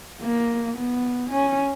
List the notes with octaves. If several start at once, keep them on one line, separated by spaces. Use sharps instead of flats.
A#3
B3
C#4